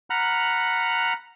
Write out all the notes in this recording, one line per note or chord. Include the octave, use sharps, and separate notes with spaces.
F#5 A#5 B5 F6 F#6